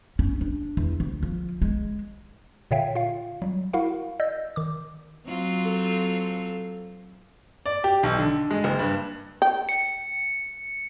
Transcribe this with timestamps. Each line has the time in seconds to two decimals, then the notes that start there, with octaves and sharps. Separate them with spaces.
0.19 C#4
0.41 D4
0.77 E2
1.00 D2
1.23 F3
1.62 G#3
2.71 A#2 D3 C#5 E5 F5 G5
2.95 F4 F5
3.42 F#3 G3
3.73 E4 F#4 A#4 F5 F#5
4.20 D5 D#5 E6 G6
4.56 D#3 D6
5.26 F#3 C4 F4
5.66 A4
7.66 D5
7.84 G4
8.03 B1
8.19 D3
8.51 G#3
8.64 F#1
8.79 G2
9.42 G5
9.69 C#7